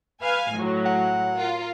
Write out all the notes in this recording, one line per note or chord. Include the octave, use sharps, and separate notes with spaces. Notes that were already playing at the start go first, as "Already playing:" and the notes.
B4 F5 G#5
A2 F#3
F#5
F4 A#4